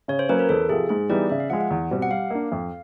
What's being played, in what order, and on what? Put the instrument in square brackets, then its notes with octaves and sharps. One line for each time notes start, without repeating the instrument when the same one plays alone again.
[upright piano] C#3 [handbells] C#5
[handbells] C5
[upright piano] F#3 A#3 C#4 [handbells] B4
[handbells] A#4
[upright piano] E2 [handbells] A4
[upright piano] C3 F3 [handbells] G#4
[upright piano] G#2 [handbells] G#4
[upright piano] E3 G3 B3 D#4 [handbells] D5
[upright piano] C#3 [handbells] E5
[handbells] F5
[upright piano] F3 G#3 [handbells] F#5
[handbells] F#5
[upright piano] E2
B2 G3 C4
[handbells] F#5
[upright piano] G3 [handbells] F5
[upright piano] A#3 D4
F2